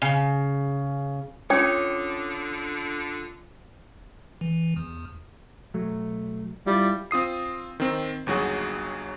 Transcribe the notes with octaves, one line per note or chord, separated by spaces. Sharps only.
C#3
D3 C#4 F4 C#5 G5 D6 D#6
E3
E2
B1 F#3 A3
G3 E4 F4
C4 F4 D#6 C7
D#3 C4
G1 D#2 F#3 F#4 G#4